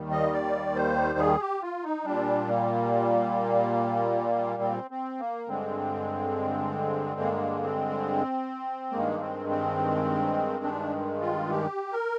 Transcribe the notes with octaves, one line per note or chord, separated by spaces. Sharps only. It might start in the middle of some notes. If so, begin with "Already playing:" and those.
Already playing: D#2 D#3 G3
D#5
D5
C5
G#4
G4
F4
D#4
A#2 G3 D4
A#3
C4
C4
A#3
G2 D3 G#3 C4
A#3
C4
G2 D#3 G#3 A#3
C4
C4
D4
F4
G4
A#4